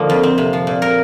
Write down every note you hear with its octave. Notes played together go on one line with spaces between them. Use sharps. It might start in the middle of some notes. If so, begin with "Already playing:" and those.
Already playing: D3 F3 A#3 D#4
F2
C4
C3
F3
A#2
A#4